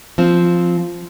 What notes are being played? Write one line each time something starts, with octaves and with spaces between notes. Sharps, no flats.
F3 C4